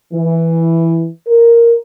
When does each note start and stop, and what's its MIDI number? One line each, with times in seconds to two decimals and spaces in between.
0.13 1.07 52
1.27 1.73 70